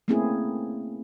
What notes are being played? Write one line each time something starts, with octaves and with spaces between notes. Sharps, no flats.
A3 A#3 C4 C#4 E4 G#4